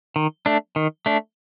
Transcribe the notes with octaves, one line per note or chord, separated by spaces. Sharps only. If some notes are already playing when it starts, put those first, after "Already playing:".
D#3
A3 D4
D#3
A3 D4